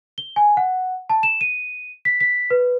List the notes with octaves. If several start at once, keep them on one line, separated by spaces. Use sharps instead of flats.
G7
G#5
F#5
A5
E7
D#7
B6
B6
B4